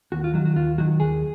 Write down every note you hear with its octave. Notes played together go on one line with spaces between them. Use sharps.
D#2 F#4
F4
D#3 F#3 F#4
F#4
D#2 F4
D#3 F#3 F#4
D#2 G#4